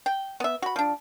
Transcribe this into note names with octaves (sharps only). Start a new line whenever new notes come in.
G5
B3 E5
F#4 B5
F3 D4